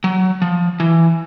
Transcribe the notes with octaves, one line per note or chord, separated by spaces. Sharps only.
F#3
F3
E3